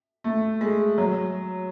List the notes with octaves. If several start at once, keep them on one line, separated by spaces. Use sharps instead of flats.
A3
G#3
F#3